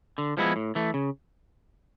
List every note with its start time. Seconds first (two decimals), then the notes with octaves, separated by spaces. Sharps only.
0.18 D3
0.37 F3 G#3 B3 E4
0.56 A2
0.75 E3 A3
0.94 C#3